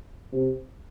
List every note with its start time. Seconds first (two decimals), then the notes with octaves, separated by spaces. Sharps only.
0.33 C3